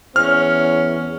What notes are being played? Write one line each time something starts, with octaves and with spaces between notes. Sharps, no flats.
E2 C#4 F6